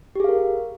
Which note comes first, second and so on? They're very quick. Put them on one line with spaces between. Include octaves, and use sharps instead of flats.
G4 G#4 F5 A#4